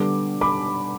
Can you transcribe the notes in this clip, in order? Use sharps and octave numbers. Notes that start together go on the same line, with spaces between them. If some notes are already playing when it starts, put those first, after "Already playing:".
Already playing: D3 G3 B3 D6
B5 D6